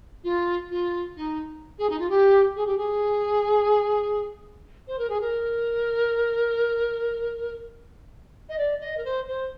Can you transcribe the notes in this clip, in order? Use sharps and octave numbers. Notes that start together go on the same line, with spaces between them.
F4
F4
D#4
G#4
D#4
F4
G4
G#4
G4
G#4
C5
A#4
G#4
A#4
D#5
D5
D#5
A#4
C5
C5